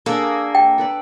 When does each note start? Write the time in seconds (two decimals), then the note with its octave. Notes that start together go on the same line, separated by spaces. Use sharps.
0.06 A#3 D4 G#4 A4
0.55 G5
0.78 A4 B4 D5